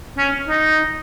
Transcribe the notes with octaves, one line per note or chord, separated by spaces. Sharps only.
C#4
D#4